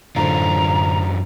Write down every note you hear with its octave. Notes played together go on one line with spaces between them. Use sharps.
F#2 A2 D3 D4 F4 C5 A#5